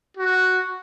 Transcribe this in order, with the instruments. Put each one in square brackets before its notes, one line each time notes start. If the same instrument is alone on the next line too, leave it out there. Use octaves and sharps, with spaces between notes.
[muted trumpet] F#4